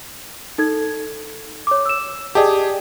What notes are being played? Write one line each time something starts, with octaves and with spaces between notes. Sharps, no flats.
D#4 A4 G#6
C#5 D6
E6 E7
G4 G#4 D5 D#5 A5